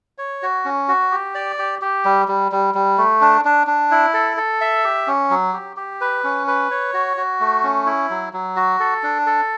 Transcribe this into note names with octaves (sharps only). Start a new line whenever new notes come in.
C#5
F#4
C#4
F#4
G4
D5
G4
G4
G3
G3
G3
G3
A3
D4
D4
D4
E4
A4
A4
E5
G4
C#4
F#3
G4
G4
B4
C#4
B4
C#5
F#4
F#4
A3
C#4
E4
F#3
F#3
F#4
A4
D4
A4